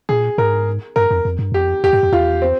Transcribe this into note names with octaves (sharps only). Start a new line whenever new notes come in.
A#2 G#4
G#2 A#4
G2 A#4
F2
F2
G2
F2 G4
E2 G4
G2
F2
E2 F4
C4